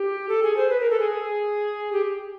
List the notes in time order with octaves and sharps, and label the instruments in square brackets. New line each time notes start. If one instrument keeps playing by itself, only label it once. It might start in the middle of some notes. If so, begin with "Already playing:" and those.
Already playing: [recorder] G4
A4
G#4
C5
B4
A#4
A4
G#4
G4